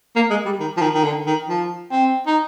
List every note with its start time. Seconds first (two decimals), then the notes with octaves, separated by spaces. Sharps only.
0.16 A#3
0.30 G#3
0.46 G3
0.60 D#3
0.77 F3
0.82 D#3
0.94 D#3
1.04 D3
1.27 D#3
1.48 F3
1.92 C4
2.27 D#4